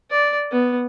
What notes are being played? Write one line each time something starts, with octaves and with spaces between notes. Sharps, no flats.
D5
B3